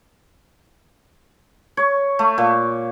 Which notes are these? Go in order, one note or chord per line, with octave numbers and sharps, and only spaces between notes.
C#5
A3
A#2